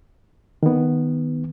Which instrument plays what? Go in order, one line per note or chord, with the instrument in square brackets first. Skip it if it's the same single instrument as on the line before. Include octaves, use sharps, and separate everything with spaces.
[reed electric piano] D#3 B3